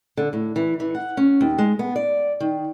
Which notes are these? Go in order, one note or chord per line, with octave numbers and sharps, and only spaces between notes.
D3
A2
E3
E3
F#5
C#4
D#2
G#3
B3
D5
D#3